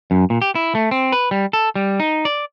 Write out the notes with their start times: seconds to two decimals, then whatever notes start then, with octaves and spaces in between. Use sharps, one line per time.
0.11 F#2
0.30 A#2
0.42 G4
0.55 E4
0.75 A3
0.91 C4
1.12 B4
1.31 G3
1.53 A4
1.75 G3
2.00 D#4
2.25 D5